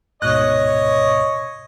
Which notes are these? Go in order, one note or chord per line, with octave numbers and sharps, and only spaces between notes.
D2 G#2 B2 C#5 D#5 F#6